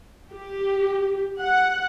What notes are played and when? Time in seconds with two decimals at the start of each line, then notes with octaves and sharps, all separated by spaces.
0.32 G4
1.40 F#5